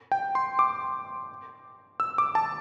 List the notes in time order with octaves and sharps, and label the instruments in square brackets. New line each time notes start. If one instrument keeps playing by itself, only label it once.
[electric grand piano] G5
C6
D6
E6
D6
A5